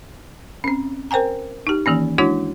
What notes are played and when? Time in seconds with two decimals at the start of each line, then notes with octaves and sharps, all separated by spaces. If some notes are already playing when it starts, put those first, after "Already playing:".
0.64 C4 C#4
1.11 A#4 C5 G5 G#5 A#5
1.67 D#4 G4
1.86 D#3 E3 A#3 C#4
2.18 G#3 D4 E4 F#4 C#5